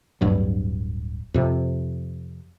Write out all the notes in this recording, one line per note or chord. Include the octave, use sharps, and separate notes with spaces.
D1 G2 F#3
F2 C3